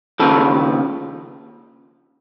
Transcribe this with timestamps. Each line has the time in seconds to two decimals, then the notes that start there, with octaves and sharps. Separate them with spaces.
0.20 D#2 C#3 F3 A4